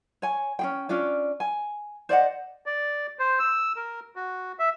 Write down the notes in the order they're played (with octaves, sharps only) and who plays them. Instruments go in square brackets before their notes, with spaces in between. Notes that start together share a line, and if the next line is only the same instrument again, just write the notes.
[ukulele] C#5 G#5
C#4 G#4 G5
C#4 D4 F4 D5
G#5
C5 D5 D#5 F#5
[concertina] D5
C5
E6
A#4
F#4
E5